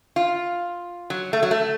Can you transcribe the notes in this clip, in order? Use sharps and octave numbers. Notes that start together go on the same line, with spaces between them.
F4
F#3
A3
F#3
A3